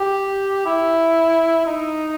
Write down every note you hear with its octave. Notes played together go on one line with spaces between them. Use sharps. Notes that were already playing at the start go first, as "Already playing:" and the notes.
Already playing: G4
E4
D#4